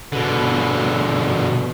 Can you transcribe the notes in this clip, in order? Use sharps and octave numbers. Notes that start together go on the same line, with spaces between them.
B2 D3